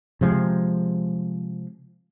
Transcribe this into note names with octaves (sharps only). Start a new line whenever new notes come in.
C3 F3 G#3